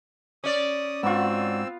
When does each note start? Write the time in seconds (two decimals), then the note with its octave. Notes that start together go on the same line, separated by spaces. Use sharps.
0.44 C#4 D5 D#6
1.03 G#2 B3 C4 F4 F#4 E6